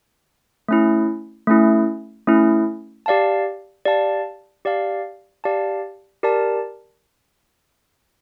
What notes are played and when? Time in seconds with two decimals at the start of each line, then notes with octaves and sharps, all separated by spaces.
0.69 A3 C#4 E4
1.47 A3 C#4 E4
2.27 A3 C#4 E4
3.06 G4 D5 F5 A5
3.86 G4 D5 F5 A5
4.65 G4 D5 F5 A5
5.44 G4 D5 F5 A5
6.23 G4 A#4 D5 A5